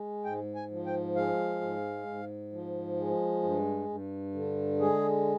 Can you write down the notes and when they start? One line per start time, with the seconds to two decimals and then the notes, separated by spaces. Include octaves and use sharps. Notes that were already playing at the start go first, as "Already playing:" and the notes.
Already playing: G#3
0.24 G#2 G5
0.55 G#5
0.71 F3
0.86 G5
1.16 G#3 F5
1.61 G#2
2.07 G#2
2.52 F3
2.98 G#3
3.43 G2
3.89 G2
4.34 D3
4.79 G#3 G#4